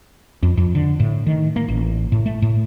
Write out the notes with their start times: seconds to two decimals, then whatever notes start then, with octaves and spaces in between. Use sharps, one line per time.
0.43 F2
0.57 F2
0.75 D3
1.00 A2
1.27 D#3
1.56 A#3
1.68 A1
2.12 A2
2.26 A3
2.42 A2